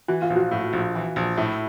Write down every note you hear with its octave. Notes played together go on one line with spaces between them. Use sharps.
E3 F#4
F4
A#1
F#4
A2
A#1
E3
A#1
A2 E4